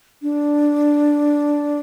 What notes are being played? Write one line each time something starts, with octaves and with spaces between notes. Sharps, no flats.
D4